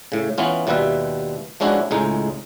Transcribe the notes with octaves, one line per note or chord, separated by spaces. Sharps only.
A2 C#3
E3 B3 C#4 F4
D#2 B2 G3 F4 B4 E5
F3 G#3 C#4 D4 E4 F#4
C#2 A2 G#3 D#4